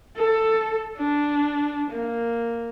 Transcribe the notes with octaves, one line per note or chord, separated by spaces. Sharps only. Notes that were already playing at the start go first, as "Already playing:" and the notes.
A4
D4
A#3